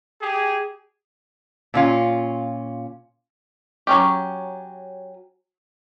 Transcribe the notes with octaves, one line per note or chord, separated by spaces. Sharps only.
G4 G#4
A#2 C#4 F4
F#3 C#4 G4